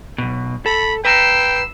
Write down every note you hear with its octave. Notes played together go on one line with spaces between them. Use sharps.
B1 B2
A4 B5
B4 G5 A#5 E6 C7